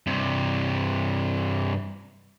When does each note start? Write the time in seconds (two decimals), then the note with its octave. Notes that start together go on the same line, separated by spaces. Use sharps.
0.07 G2 C3